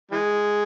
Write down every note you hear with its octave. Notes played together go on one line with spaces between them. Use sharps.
E3 G#3